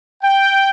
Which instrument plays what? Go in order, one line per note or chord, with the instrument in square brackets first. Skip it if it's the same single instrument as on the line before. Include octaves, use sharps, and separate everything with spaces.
[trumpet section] G5